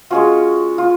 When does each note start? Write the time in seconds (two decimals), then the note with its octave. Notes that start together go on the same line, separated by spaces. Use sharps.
0.10 G#3 C#4 F4 F#4
0.78 F4